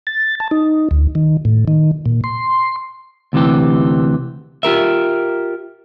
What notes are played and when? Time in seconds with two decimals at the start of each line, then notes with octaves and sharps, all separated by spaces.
0.07 A6
0.40 A5
0.51 D#4
0.91 D2
1.15 D#3
1.45 A2
1.68 D#3
2.06 A#2
2.24 C6
3.33 D2 C3 E3 G4
4.63 F4 G4 A#4 E5